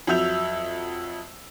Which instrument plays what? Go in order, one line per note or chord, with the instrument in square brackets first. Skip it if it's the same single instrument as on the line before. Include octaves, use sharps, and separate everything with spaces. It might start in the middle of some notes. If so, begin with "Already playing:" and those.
[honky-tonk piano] F2 F#3 E5 E6 G6 F7